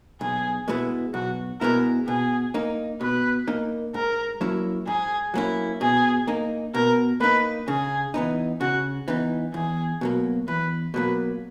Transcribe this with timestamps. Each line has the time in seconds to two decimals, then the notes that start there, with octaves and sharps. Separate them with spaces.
0.21 B1 G#4
0.68 B2 G#3 B3 E4
1.14 B1 F#4
1.61 B2 G#3 B3 E4 A#4
2.07 B2 G#4
2.54 A#3 D#4
3.01 B2 B4
3.47 A#3 D#4
3.94 G#2 A#4
4.41 F#3 A#3 C#4 E4
4.87 G#2 G#4
5.34 F#3 A#3 C#4 E4
5.81 B2 G#4
6.27 A#3 D#4
6.74 B2 A#4
7.21 A#3 D#4 B4
7.68 C#3 G#4
8.14 E3 B3 D#4
8.61 C#3 F#4
9.08 E3 B3 D#4
9.54 E2 G#4
10.01 B2 F#3 A#3
10.48 E2 B4
10.94 B2 F#3 A#3 B4